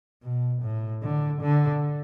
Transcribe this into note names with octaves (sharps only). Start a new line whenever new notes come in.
B2
A2
D3
D3